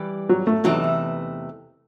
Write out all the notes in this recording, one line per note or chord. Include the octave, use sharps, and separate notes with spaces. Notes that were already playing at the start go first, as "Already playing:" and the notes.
Already playing: E3 G3 G4 B4
F#3
A3
E2 C3 E3 F#3 A3 D#4